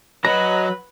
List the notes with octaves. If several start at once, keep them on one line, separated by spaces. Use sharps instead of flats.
F#3 F#4 B4 D#5 A#5